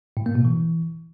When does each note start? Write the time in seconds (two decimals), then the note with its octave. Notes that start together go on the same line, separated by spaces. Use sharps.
0.17 A2
0.26 A#3
0.35 B2
0.45 E3